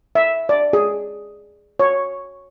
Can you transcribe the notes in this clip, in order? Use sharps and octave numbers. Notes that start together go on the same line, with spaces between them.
E5
D5
G#4
C#5